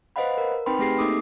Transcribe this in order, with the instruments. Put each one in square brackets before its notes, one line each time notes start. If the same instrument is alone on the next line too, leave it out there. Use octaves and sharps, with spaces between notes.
[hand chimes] B4 C5 D#5 F5 F#5 B5
A#4
C4 D#4 B4 G5 B5 C6
A3 C4 G4 G#4 A#6 C7
A#3 D#4 A4 D6 D#6